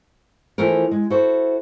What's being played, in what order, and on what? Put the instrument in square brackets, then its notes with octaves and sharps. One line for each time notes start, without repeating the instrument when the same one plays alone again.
[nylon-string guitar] E3 F3 A3 A#4
G#3
E4 F#4 A4 C5